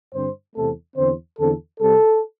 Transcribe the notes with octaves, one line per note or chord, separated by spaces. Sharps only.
G2 D3 C4 C5
E2 C3 A3 C4 A4
E2 D3 C4 C5
E2 D3 C4 A4
C3 G3 C4 A4